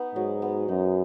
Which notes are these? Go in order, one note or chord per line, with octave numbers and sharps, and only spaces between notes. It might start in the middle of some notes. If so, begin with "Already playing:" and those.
Already playing: B3 D#4
G#2 F#3
B3
F#2 D#4